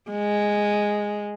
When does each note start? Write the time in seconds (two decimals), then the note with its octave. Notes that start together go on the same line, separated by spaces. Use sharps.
0.11 G#3